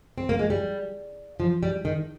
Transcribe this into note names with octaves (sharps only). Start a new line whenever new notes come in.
C4
A#3
G#3
G3
F3
G3
D#3